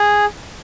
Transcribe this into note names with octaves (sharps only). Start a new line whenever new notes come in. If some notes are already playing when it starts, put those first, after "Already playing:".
Already playing: G#4